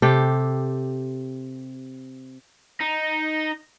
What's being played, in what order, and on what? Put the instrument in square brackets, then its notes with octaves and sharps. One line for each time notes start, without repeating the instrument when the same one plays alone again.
[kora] C3 G4 A4
[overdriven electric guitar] D#4